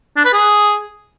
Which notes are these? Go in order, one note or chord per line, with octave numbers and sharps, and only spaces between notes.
D4
B4
G#4